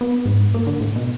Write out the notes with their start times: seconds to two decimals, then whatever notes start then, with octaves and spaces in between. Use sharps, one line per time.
0.01 B3
0.25 G#2
0.54 A#3
0.67 D3
0.81 A2
0.96 B2